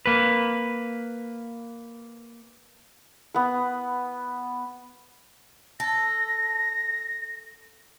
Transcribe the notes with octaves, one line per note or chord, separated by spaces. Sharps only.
A#3 B4
B3 B4
A4 A#6